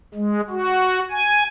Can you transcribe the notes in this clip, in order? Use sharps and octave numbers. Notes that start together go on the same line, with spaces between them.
G#3
F#4
G#5